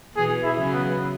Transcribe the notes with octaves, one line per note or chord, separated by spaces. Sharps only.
B2 E3 G#4
E4
C#3 F#3
B3